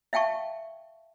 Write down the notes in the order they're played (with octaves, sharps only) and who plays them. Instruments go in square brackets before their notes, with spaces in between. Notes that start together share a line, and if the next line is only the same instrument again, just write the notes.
[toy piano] E5 F5 G5 A5 C#6